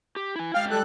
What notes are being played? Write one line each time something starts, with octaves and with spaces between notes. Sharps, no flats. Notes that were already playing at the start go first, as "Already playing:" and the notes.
G4
E4 G#5
G#3 F5 G5 F6
G3 A4 F#6